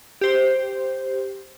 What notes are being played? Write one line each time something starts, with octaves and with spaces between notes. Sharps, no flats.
G4 C5